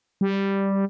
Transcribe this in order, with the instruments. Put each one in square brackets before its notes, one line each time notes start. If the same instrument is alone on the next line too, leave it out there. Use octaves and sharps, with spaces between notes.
[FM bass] G3